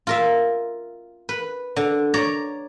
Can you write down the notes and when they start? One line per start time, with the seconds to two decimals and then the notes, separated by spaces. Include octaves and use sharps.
0.07 F4 A#4 E5
1.29 B4
1.76 D3
2.14 C#5 D5 A#5